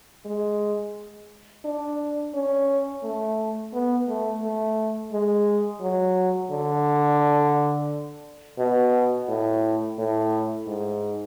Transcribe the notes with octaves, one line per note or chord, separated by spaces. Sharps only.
G#3
D4
C#4
A3
B3
A3
A3
G#3
F#3
D3
B2
A2
A2
G#2